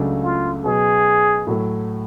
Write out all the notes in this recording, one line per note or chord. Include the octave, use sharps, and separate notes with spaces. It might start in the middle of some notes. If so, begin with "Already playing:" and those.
Already playing: C#2 C#3 F#3 A3 D4
F4
B2 F#3 B3 G#4
A2 F#3 A3